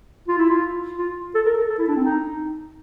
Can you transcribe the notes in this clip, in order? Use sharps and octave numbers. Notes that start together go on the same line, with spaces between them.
F4
E4
F4
F4
A4
A#4
A4
A4
E4
D4
C4
D#4